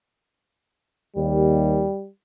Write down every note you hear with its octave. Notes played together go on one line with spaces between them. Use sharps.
D#2 G3